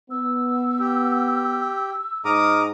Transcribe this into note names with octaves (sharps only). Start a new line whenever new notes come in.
B3 E6
G4
G#2 G#3 A#5 D6 D#6 F6